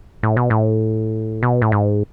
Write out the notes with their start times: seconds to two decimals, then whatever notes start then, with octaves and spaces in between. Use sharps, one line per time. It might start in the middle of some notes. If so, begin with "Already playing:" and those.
0.23 A2
0.37 B2
0.50 A2
1.43 B2
1.62 A2
1.72 G#2